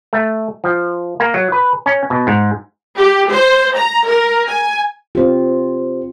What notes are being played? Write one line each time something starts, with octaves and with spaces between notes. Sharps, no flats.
A3
F3
A#3
F#3
B4
C#4
B2
G#2
G4
C5
A#5
A#4
G#5
C4 F4 G4 C5